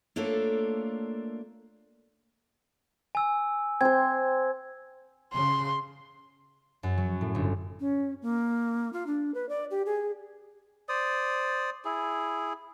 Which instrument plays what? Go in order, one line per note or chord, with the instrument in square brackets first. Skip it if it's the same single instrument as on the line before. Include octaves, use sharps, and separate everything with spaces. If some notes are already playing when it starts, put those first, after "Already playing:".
[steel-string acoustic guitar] A3 A#3 D4 F4 A4 C#5
[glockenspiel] G#5 E6
[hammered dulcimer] C4 C5 [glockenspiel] G#6
[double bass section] C#3 [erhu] C6
[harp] F#2
F#3
A2
G1
[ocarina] C#4
A#3
F4
D4
B4
D5
G4
G#4
[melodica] C5 D5 D#6
E4 G#4